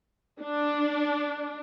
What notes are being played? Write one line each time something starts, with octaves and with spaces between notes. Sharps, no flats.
D4